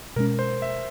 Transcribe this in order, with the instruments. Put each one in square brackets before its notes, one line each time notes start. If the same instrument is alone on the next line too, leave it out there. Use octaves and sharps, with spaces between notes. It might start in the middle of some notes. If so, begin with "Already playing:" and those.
[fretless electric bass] B2 G#3 C#4 [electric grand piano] A#4
[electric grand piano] C5
E5